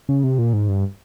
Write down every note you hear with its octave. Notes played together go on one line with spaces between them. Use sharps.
C#3
C3
A#2
G#2
G2